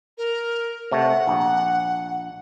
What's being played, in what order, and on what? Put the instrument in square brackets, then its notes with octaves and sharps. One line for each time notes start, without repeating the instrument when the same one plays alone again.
[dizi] A#4
[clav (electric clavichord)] C3 A3 [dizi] F#5
[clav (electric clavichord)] A#1